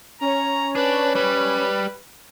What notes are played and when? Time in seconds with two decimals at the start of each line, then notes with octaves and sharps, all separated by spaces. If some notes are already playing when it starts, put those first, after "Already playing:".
0.21 C#4 C#5 A#5
0.75 D4 B4
1.15 G3 B4